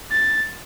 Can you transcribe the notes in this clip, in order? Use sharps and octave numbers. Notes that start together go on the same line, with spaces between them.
A6